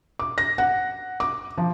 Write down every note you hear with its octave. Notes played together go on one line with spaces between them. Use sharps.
D6
A#6
F#5
D6
F3